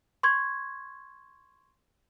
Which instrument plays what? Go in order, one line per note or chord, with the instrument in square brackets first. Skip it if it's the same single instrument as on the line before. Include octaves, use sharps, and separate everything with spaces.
[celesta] C6 C#6 G#6